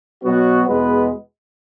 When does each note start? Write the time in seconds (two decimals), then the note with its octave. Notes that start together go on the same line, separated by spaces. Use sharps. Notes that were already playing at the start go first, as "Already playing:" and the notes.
0.23 B2 F#3 B3 F#4
0.67 E2 B2 G#3 B3 B4